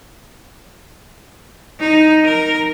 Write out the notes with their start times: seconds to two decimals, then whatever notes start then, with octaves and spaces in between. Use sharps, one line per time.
1.79 D#4
2.24 A#4